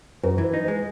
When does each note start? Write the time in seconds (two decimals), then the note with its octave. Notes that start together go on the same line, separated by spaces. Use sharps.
0.23 F#2 A#4
0.38 E3
0.43 B4
0.54 D#4
0.64 G#3 B4